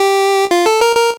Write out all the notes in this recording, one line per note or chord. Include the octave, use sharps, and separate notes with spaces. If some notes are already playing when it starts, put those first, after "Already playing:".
Already playing: G4
F4
A4
A#4
A#4